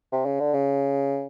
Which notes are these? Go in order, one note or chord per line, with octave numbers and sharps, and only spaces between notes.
C3
C#3
D3
C#3